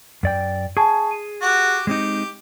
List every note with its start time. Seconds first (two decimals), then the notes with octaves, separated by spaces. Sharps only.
0.23 F#2 D5 G5
0.77 G#4 G#5 A5 C#6
1.11 D#7
1.42 F#4 G4
1.87 G#3 C4 D#4 G4